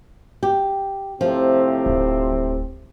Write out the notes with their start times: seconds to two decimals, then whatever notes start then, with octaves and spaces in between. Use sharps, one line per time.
0.43 G4
1.21 A2 C3 F3 C4
1.86 D1